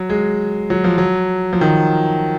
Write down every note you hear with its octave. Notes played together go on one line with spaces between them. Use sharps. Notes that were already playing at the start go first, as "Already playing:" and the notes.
Already playing: F#3
G#3
F#3
F3
F#3
F3
D#3